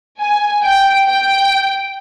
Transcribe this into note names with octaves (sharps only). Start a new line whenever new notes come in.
G#5
G5
G5